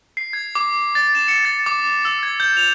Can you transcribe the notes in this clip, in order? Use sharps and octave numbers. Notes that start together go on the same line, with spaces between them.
C7
G#6
D6
A6
E7
C#7
A6
D6
E6
G#6
G6
F7